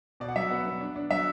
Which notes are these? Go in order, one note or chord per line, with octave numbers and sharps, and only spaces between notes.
B2 D5
F#5
F#3 E5
B3 F#5
B3
D4
D4
F#3 E5